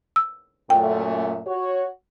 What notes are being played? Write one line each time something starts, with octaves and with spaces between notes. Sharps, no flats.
E6
F#2 A#2 A3 G5
F#4 C#5